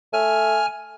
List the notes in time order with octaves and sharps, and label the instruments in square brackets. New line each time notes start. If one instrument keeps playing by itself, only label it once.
[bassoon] A3 [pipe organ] G#5 F6